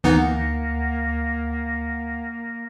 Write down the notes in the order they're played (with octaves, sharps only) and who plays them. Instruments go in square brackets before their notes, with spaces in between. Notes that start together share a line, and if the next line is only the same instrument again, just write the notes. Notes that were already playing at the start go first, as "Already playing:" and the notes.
[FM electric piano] D2 F#5 C#7 [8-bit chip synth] E3 B3 D#4 [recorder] A#3